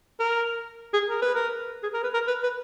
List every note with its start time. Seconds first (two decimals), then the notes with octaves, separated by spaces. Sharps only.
0.20 A#4
0.93 G#4
1.09 A#4
1.22 B4
1.34 A#4
1.83 G#4
1.94 A#4
2.03 B4
2.13 A#4
2.27 B4
2.43 B4